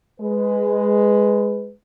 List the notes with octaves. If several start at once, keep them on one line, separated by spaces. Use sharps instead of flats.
G#3 B4